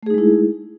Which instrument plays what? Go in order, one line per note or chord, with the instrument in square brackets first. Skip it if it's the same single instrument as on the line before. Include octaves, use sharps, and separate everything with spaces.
[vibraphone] A3
G#4
D#4
G#3
E4